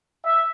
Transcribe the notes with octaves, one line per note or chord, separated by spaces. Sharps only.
E5